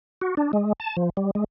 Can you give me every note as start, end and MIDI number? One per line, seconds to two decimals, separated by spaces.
0.21 0.35 66
0.37 0.52 62
0.53 0.73 56
0.80 0.96 81
0.97 1.10 53
1.17 1.31 55
1.35 1.44 56